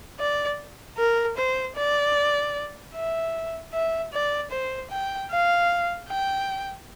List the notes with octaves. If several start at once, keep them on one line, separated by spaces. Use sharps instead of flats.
D5
A#4
C5
D5
E5
E5
D5
C5
G5
F5
G5